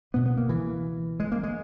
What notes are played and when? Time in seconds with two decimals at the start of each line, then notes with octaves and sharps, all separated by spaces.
0.14 C#2 B2 B3
0.26 B3
0.38 A#3
0.49 E3
1.20 G#3
1.32 A#3
1.43 G#3